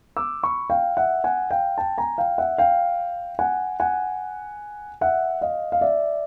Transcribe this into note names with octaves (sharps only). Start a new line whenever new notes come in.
D6 E6
B5 C#6
F5 G5
E5 F#5
F#5 G#5
F5 G5
G5 A5
G#5 A#5
F5 G5
E5 F#5
F5 G5
F#5 G#5
F#5 G#5
E5 F#5
D#5 F5
F5
D5 E5